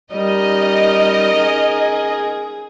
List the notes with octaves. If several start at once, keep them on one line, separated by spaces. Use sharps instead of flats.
G3 C#4 D#4 A#4 D#5
G#4